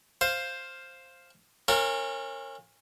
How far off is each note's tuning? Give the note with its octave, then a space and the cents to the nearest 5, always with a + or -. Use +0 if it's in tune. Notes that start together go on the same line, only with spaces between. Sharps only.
C5 +10 F5 +0
C#4 -30 F4 +35 A#4 -20